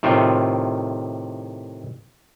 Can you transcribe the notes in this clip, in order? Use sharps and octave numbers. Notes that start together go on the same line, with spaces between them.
A2 C3 D#3 F4